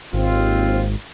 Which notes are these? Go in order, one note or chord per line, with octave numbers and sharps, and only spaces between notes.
G#1 D#2 C4 F4